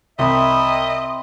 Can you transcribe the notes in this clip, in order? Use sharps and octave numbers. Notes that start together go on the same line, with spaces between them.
C2 C4 D#5 E5 A#5 B5 D#6